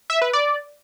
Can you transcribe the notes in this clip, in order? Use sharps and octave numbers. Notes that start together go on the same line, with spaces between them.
E5
B4
D5